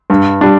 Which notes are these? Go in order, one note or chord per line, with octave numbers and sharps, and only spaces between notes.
G2
G3 D4